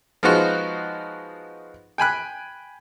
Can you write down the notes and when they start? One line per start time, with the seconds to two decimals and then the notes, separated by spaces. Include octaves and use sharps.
0.23 F3 G#3 B3 D#4 F4 F#4
1.98 G5 G#5 B5 F#6